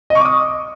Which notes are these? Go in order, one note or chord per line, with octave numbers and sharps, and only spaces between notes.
D#5
C#6
D6
D#6